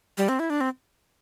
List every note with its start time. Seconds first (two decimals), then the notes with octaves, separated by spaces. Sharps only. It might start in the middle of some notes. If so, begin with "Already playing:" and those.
0.18 G3
0.29 C4
0.39 E4
0.50 D4
0.61 C4